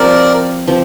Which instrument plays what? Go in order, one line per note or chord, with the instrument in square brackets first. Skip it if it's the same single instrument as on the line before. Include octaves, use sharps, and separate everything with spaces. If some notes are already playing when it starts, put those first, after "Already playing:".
Already playing: [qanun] F3 C4 G4 [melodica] A#4 D5
[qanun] F3 C4 G4